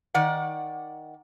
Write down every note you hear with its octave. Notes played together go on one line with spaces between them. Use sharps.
D#3 D5 F#5